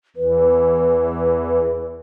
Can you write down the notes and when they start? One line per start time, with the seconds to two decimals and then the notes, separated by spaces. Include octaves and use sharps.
0.16 E2 E3 B4